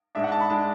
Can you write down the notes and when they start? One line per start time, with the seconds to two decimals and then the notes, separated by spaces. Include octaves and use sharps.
0.15 G#2 G#3 D4 E5
0.24 F#5
0.32 A5
0.41 B5
0.50 G#3 D4 A5